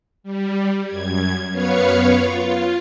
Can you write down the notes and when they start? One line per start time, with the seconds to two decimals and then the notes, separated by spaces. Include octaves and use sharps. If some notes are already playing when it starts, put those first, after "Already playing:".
0.23 G3
0.86 F#2 G#6
1.51 F#2 B3 B4 C#5 F5 C#7
2.14 F4